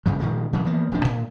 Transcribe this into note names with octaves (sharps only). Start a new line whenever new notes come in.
G#1 G2 C#3 F3
A#2 D#3 F3 G#3
A#2 C#3 E3 F#3
E3 F3 A#3 B3
D#1 F2 F3 D4
A2